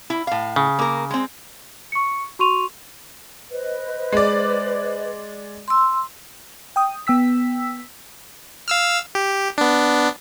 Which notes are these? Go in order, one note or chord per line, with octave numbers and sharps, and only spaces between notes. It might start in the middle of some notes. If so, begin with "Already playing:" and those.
E4
A2 F5
C#3
A#3 A#4
G#3 C4
C#6 C#7
F#4 C6 C#6 D#7 F7
B4 C5 D#5
G#3 D5
C6 E6
G5 D#6
B3 G5 E6 B6
F5 E6 F6
G4
B3 D4